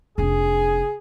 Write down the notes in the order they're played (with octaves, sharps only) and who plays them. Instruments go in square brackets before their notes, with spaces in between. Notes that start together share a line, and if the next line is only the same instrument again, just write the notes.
[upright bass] F1 D4 [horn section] G#4